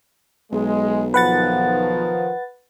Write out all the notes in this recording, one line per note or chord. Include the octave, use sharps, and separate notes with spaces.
B1 G#3
D#3 F3 B4 F#5 A6